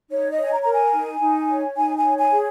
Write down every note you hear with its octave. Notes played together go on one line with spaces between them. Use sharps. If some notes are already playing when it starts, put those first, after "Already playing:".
D#4 C#5
D#5
C#5
G#5
A#5
A#4 A#5
G#5
D#4
D#4
C#5
D#4 G#5
G#5
C#5
G#5
G#4